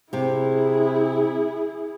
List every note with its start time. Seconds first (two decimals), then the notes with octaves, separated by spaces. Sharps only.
0.13 C3 E4 G4 G#4